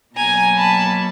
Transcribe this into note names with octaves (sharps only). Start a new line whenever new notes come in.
B2 F#3 A#3 G#5 A#5
A5 B5